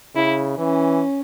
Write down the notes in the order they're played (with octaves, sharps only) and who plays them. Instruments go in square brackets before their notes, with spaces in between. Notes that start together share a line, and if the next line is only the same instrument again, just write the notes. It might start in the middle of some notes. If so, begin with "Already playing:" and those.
[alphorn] C#3 [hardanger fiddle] E4
[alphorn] E3 [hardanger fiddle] C#4